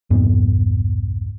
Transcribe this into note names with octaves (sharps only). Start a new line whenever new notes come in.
C2 F2 G#2 B3